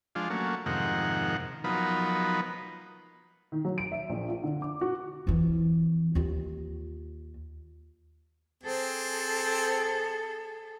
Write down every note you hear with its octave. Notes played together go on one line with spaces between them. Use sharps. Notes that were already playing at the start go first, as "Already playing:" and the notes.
F3 G#3 D4 F4
F#3 A3 A#3 C#4
F2 G#2 C3 D#3 A#4 F#5
F3 F#3 B3 D#4 A#4 B4
D#3
F#3
D7
E5
A#1
F4
D3
D6
F#4
F2 E3
D#2 F4
C4 G#4 A4